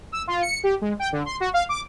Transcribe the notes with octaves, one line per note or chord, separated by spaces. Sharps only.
E6
F4
C#7
G4
G#3
G5
D3
C6
F#4
F5
D6